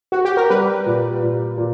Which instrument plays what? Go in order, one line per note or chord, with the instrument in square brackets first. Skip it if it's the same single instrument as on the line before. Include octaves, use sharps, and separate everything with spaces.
[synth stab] F#4
G4
A#4
[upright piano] G3 [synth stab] B4
[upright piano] A#2
A#2
A#2